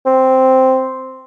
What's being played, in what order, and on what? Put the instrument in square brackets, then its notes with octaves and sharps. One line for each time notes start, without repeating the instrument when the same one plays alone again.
[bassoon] C4